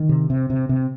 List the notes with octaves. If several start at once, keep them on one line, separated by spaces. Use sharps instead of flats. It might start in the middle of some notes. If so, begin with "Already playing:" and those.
Already playing: D#3
C3
C3
C3
C3